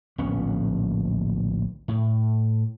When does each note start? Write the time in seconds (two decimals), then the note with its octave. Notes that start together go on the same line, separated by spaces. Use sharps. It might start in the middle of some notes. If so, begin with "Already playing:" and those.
0.18 D1 A#1 B3 C#4
1.88 A2